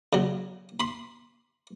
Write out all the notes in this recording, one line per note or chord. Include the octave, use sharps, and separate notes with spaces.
C#3 F#3
B5 C6